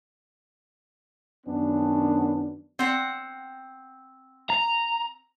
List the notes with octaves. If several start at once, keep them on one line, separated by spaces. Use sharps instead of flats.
F#2 D#3 B3 C#4 D4
C4 F#5
A#5